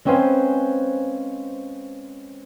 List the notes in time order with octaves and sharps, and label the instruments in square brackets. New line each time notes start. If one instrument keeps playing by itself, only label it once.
[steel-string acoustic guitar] G#3 C4 C#4 B4 C5 F5